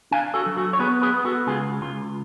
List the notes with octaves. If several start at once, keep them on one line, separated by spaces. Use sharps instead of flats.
D4 F5 G#5
F#4 A4
F#3
F#4 A4
C#5
B3 G#4 B4
G#4 B4
B3
F#4 A4
C#2 F4 G#4
C#2 F4